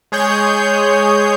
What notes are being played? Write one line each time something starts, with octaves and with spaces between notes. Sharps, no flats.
G#3 G#4 C#5 G6